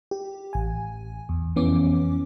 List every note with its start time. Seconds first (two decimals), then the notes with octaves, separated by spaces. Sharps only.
0.11 G4
0.53 A1 G#5
1.29 E2
1.56 F2 E3 B3 C#4 D6